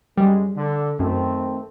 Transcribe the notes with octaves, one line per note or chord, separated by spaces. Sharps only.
F#2 G3 G#3
D3
F#2 D#3 A3 C4